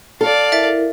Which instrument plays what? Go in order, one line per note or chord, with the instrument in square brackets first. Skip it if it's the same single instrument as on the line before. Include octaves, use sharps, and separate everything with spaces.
[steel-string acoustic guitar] A4 [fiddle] D5 F5
[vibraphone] E4 A#4 [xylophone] E5 A6